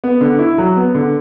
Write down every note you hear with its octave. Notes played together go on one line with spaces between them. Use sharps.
B3
D3
E4
F#3
B3
D3